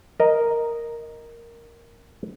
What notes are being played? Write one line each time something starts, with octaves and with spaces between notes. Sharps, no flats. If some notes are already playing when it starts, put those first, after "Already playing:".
A#4 D#5